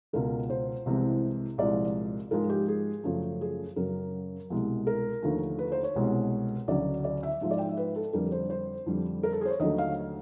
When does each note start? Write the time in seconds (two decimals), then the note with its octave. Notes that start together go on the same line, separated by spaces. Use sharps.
0.13 C#2 B2 G#3 A#4
0.50 C5
0.86 C2 C3 E3 G#3
1.58 C2 A#2 F3 G#3 D5
2.31 G#2 F3 G#3 A#4
2.49 G4
2.68 G#4
3.04 F#2 C#3 F3 A3
3.41 G#4
3.76 F#2 C#3 F#3 A#4
4.50 C2 B2 G#3
4.87 A#4
5.23 D#2 D3 F3 A3
5.59 B4
5.72 C5
5.83 C#5
5.96 C2 B2 G#3
6.68 D2 C#3 F#3 D5
7.04 D5
7.23 E5
7.41 G#2 F3 G#3 E5
7.51 D5
7.59 G5
7.69 E5
7.77 B4
7.96 A4
8.13 F2 D3 G3 A#4
8.32 C5
8.50 C5
8.86 F2 D3 G3
9.23 A#4
9.33 A4
9.41 G#4
9.45 C5
9.50 C#5
9.60 D#2 D3 F#3 A3 D#5
9.78 F5